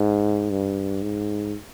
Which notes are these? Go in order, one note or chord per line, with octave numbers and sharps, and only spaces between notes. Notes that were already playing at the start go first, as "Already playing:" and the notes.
Already playing: G#2
G2
G#2